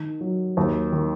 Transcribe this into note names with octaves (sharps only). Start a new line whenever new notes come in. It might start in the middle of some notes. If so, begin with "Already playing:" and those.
Already playing: D#3 D#4
F#3
D#2
D#3